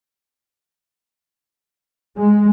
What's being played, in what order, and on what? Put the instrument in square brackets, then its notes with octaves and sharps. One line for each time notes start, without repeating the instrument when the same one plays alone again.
[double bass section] G#3